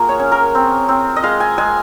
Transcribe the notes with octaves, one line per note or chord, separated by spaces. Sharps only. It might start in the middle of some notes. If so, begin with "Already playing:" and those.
Already playing: A#3 F4 F#4 G#4 A#4
C#5
C#4
A#4
C4
C4
D#5
G#3 F5
G#5
G#3 G#5